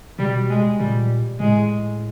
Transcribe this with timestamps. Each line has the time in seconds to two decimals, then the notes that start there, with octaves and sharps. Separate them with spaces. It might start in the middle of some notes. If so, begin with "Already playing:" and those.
0.19 B2 G3
0.50 G#3
0.79 A#2 G3
1.40 A2 G#3